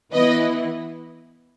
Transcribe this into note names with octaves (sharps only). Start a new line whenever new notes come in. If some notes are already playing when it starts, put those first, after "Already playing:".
E3 B3 E4 B4 D#5